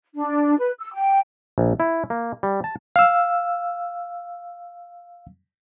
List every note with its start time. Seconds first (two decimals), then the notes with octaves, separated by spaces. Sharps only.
0.15 D4
0.57 B4
0.78 E6
0.93 G5
1.58 A#1
1.80 E4
2.10 A#3
2.43 G3
2.64 A5
2.96 F5 E6